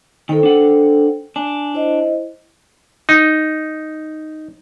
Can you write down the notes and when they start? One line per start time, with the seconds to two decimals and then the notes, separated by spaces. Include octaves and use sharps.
0.29 D#3 A4 C5 G5
0.43 D4 F#5
1.36 D4 G#5
1.74 E4 C5 D#5
3.09 D#4